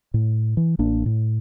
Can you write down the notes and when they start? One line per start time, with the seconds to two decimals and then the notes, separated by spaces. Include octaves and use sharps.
0.14 A2
0.57 E3
0.79 A1 A#3 D4
1.06 A2